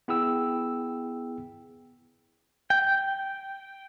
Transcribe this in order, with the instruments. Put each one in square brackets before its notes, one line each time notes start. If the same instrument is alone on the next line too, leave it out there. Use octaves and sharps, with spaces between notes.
[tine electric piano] B3 E4 G#4 G5 E6
[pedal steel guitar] G5